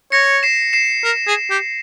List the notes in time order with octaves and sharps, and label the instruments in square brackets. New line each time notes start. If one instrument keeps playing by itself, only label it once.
[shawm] C#5 [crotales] A#6 C#7
[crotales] C7 E7
C7 E7
[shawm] A#4
G#4
G4